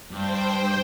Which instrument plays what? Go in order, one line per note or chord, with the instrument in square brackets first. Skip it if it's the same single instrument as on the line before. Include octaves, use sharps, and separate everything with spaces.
[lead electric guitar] G2 [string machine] C5 G5